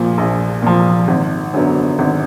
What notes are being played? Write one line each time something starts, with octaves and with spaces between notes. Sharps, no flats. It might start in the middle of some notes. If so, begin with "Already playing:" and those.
Already playing: A#1 A#2 F3
A#1
A#2 F3
G#1
F#2 D3 F#3 B3
G#1